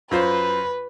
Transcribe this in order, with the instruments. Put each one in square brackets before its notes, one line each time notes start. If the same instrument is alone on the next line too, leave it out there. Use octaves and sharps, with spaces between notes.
[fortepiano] F#2 F4 C5 [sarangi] B4